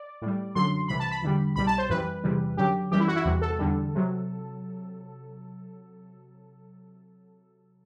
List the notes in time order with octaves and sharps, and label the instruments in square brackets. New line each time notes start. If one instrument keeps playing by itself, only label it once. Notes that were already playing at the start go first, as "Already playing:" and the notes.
Already playing: [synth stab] D5
A2 G3
F#2 D3 F#3 C6
C2 C3 E3 B5
A5
B5
E2 D3 G3
C2 B2 G3 B5
A5
C5
F#2 E3 G3 B4
E2 C3 E3 G3
F#2 D3 F#3 G4
F#2 E3 G3 G4
E4
F#4
E4
E2 C3 E3 G3 F#4
A4
E2 D3 G3
C3 F#3